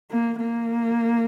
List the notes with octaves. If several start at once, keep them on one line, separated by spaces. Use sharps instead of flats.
A#3
A#3